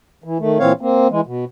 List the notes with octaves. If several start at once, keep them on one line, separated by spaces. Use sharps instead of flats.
E3
D#3 A3
A#2 E3 C4 C#5 F5
A#3 C4
E3 G#3
B2